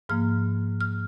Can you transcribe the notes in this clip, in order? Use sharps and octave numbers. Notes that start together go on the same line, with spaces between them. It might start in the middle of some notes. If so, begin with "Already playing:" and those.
G#2 F3 A#3 F6
F6